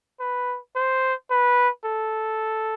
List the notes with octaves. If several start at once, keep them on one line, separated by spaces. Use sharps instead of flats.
B4
C5
B4
A4